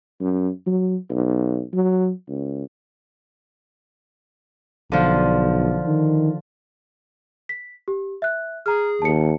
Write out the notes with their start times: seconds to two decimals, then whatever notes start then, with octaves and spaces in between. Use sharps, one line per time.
0.21 F#2
0.67 F#3
1.10 B1
1.73 F#3
2.29 C#2
4.92 B1 D3 F3
5.86 D#3
7.49 B6
7.88 G4
8.22 E5 F#6
8.66 G#4 A#5 F6
9.02 D#2 A5 C#7